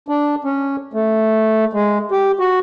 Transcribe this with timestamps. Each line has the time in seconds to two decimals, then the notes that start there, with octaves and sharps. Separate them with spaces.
0.08 D4
0.44 C#4
0.93 A3
1.73 G#3
2.11 G4
2.39 F#4